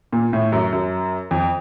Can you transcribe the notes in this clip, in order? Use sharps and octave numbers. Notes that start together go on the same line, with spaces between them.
A#2
A2
F#2
F#2
F2